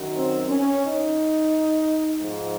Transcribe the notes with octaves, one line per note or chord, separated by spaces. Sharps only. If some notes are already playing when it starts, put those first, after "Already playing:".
Already playing: F#2 D#3 F#3
C4
C#4
D#4
G#2 F3